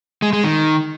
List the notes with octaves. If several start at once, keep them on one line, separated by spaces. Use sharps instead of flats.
G#3
G#3
D#3